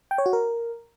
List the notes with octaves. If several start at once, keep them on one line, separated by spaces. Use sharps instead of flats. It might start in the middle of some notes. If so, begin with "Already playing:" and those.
G5
C#5
F#4
A#4